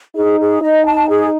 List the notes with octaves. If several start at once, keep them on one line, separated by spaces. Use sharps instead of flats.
D#4 G#4
G#4
D#4 D#5
A5
G#4